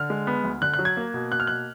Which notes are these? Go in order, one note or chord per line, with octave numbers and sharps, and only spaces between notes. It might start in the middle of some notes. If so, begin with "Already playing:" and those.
Already playing: D3 F6
G#3
B3
D2
D3 F#6
F#6
F#3
G#6
A#3
B2
A#3 F#6
F6
B2 F#6